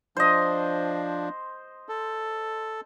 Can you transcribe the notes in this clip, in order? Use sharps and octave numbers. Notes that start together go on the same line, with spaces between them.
F3 D4 C5 D#5
A4